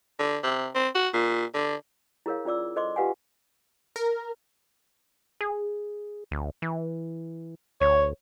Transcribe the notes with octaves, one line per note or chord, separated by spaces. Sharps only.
D3
C3
C4
F#4
A#2
D3
E4 G#4 A#4 C#5 F5
C#4 F4 D5 D6 E6
A4 C5 D#5 C6 D6
F4 G4 B4 F5 F#5 G#5
A#4
G#4
D2
E3
D2 C#5